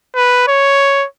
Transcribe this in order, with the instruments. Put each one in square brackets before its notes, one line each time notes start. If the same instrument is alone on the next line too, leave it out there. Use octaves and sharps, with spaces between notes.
[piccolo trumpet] B4
C#5